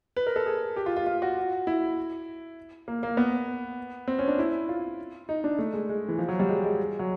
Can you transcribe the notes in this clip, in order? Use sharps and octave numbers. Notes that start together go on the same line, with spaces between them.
B4
A#4
A4
G#4
G4
F4
F4
F4
F#4
E4
A#3
A#3
B3
C4
C#4
D4
E4
F4
D#4
D4
A3
G#3
G#3
E3
F3
F#3
G3
G#3
G#3
F#3